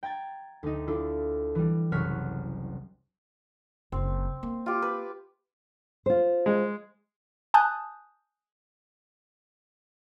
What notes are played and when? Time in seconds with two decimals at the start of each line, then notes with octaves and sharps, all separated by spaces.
0.03 G5 A#5 G#6 A6
0.63 D2 D#4
0.87 D4 E4 F4 A4
1.55 E3 G3
1.92 F#1 C2 C#5 F6 F#6 B6
3.92 F#1 C4
4.43 A#3
4.66 F4 G4
4.82 B4
6.06 F4 C5
6.46 G#3
7.54 G#5 A5 D#6 F#6 G6